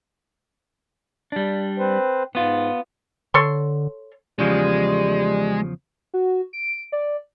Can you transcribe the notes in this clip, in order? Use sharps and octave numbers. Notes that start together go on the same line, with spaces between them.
G3 D4
C4 B4 C5
G#2 B3 F4
D3 A4 C#5 C6
E2 C#3 F3 G3 G#3
F#4
D7
D5